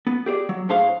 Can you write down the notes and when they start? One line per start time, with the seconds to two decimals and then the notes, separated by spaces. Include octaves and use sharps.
0.07 B3
0.26 G4 G#4 C5 D5
0.49 F#3
0.69 A2 D4 G#4 C5 F5 C6